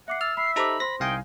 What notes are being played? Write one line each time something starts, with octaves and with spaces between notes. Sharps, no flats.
E5 F#5 D6 C7
E6 F6 A6
E5 B5 C7
D#4 G4 A4 C5 A#5 B5 D6
C5 C6 A#6
C2 D#4 F5 G5 G#5